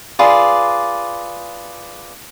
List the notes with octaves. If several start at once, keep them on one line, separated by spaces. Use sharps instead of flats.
F4 G#4 B4 D5